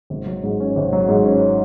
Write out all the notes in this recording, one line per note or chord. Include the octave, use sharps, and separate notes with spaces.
G#1
F#3
G#2
C#4
G#1
F#3
G#2
C#4